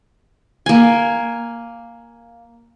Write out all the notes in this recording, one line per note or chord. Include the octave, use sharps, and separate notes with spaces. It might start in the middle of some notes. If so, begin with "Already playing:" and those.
A#3 G#5